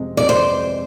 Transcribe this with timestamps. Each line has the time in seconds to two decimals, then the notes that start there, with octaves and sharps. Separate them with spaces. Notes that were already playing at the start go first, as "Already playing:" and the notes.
Already playing: F2 C3 G#3 C4
0.17 F2 C3 G#3 C4 D5
0.29 C5